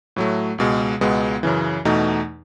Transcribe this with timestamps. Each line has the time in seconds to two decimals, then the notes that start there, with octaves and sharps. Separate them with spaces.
0.16 A2 F#3 A3
0.58 C#2 B2 G#3
1.01 C#2 B2 G#3 B3
1.43 F#2 C#3 E3
1.85 E2 B2 A3 D#4